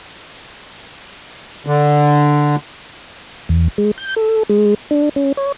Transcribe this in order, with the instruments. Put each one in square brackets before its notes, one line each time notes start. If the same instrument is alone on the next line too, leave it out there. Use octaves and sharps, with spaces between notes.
[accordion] D3
[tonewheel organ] E2
G#3
G6
A4
G#3
D4
C#4
C#5